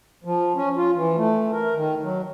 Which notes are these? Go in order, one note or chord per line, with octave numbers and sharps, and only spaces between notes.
F3
C#4
F4
E3
A3
A#4
D#3
F#3